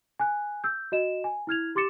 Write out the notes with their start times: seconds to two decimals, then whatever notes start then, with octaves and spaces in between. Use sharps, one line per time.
0.19 G#5 F#6
0.64 E6 G6
0.92 F#4 D#5 E7
1.24 G#5
1.47 E4 F6 G#6 F7
1.75 G4 C6 D6 A6 C#7 E7